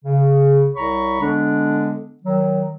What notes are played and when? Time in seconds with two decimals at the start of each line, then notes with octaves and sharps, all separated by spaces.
0.04 C#3
0.75 C2 C#5 A#5 B5 C#6
1.20 D3 G#3 B3 D4
2.23 D#3 F#3